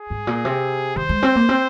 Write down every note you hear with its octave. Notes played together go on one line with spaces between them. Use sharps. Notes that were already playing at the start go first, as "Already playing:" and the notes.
Already playing: G#4
G#2
A#2
C3
D#3 C5
G#3
C4
A#3
C4